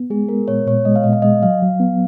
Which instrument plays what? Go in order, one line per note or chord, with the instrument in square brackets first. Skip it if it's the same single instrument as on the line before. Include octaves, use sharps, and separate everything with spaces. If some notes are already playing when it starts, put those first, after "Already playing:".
Already playing: [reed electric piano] B3
[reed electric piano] G#3 [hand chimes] G#4
[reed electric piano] B3 [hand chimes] A#4
[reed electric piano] A#2 [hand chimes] C#5
[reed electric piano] A#2 [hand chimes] C#5
[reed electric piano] G#3 [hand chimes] D#5
[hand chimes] F5
[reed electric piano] A#2 [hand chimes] D#5
[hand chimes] F5
[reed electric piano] G#3 [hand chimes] D#5
[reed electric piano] F#3 [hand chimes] F5
[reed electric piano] F#3
B3